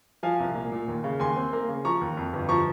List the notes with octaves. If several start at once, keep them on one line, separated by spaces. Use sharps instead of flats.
F3 F5 G#5
C2
A#2
A#2
D#2
C#3
D#2 G#5 C6
C4
A#3
C#3
F3 A#5 C#6
D#2
F2
G1
F3 A#5 C#6